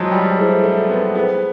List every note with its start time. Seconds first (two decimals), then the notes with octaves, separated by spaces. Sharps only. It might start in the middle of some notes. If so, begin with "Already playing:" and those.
Already playing: F3 F#3 G#3 E4 G#4 C5
0.12 G3
0.37 A3 E4 G#4 C5
0.64 A3
0.90 B3
1.15 B3 E4 G#4 C5